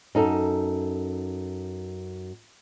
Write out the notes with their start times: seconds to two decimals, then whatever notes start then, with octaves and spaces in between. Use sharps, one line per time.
0.15 F#2 D#4 A4